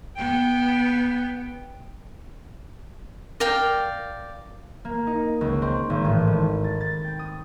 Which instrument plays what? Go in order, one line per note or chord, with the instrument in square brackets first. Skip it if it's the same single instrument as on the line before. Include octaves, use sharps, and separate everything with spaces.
[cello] B3 [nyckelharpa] G5
[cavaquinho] A#4 D5 F5 G5
[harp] A#3
D#4
C#2
C4
G#1
A1
G#1
A6
A6
G5
D#6